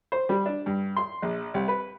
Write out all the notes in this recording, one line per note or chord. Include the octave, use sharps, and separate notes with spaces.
C5
G3
D4
G2
C6
A#1
C2
B4